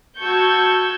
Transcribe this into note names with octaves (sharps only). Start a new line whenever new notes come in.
F#4 A5 C#6 E6 G6 G#6